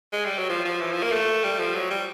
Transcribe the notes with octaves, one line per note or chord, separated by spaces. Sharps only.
G#3
G3
F#3
F3
F3
E3
F3
A#3
A3
G3
F3
F#3
G3